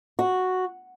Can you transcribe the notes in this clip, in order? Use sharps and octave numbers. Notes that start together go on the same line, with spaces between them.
F#4